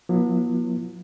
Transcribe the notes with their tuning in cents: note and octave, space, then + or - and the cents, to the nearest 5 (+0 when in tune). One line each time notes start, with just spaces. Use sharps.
F#3 -35 B3 -45 E4 +20